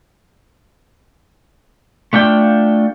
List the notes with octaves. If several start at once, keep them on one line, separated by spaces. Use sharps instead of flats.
A3 D4 F4 G5